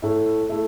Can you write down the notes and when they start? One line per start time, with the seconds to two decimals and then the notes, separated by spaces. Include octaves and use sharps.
0.02 A2 A3 E4
0.49 A3 E4